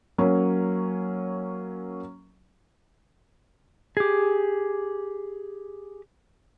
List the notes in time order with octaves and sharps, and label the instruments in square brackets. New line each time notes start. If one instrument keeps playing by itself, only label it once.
[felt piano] F#3 A#3 C#4
[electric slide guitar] G4 G#4